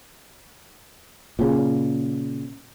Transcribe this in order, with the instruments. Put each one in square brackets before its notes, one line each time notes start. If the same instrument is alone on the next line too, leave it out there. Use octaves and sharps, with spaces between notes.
[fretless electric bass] A#2 C#3